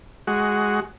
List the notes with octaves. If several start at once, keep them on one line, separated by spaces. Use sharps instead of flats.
G#3 F#4